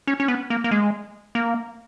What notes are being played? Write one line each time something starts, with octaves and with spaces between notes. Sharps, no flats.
C#4
C#4
B3
A#3
A#3
G#3
A#3